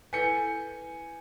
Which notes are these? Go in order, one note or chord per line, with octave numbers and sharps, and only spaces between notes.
E4 A4 B4 G#5 G6 C#7